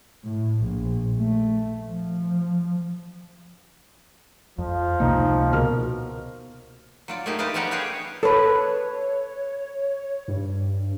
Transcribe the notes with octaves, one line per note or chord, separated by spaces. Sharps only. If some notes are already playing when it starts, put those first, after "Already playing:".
A2
A#1
A3
F3
F2 F3
C#2 C3 A#3 D#4
B2 A#4 F6
F#3 F4 D5
A3 A#3 D#4 G4 G#4
G4 B4 C5 D5 D#5 F5
G3 B3 C#4 G4 F#5 A#5
G4 G#4 C5 C#5 F5 G5
A4 B4 C#5
G2